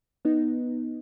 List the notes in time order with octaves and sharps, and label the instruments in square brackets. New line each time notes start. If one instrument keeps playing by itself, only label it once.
[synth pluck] B3 D#4